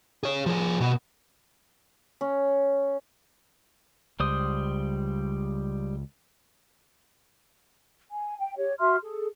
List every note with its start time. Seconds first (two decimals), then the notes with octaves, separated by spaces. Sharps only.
0.23 G#4 C#5
0.46 F3 G#4
0.80 B2 B3
2.21 C#4
4.20 C#2 G3 C5 D#6
8.11 G#5
8.40 G5
8.57 G4 C#5
8.80 F#4 E5 C6 F6
9.02 G#4 A4